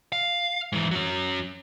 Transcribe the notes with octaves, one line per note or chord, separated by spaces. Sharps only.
F5
G#2 E3
F#3 C#4